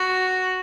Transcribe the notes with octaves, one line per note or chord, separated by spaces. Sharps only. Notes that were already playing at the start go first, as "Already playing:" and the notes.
Already playing: F#4